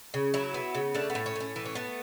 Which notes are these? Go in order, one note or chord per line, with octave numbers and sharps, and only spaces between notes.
C#3
F#3 E4
B3
C#3
A3 D4
B3
A2
C#4
A2
C#4
E3 B3
C#4
A3 B3